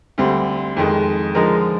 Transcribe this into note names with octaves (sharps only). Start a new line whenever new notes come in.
D2 D3 G3 C4
F2 D#3 G#3
D3 F3 G#3 D#4 A#4